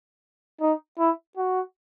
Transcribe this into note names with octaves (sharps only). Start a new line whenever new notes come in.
D#4
E4
F#4